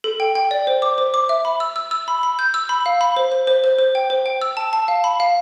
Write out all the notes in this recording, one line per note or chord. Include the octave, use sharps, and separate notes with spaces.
A4
G5
G5
D5
C5
D6
C5
D6
E5
B5
E6
E6
E6
B5
B5
G6
E6
B5
F5
B5
C5
C5
C5
C5
C5
G5
C5
G5
E6
A5
A5
F5
B5
F5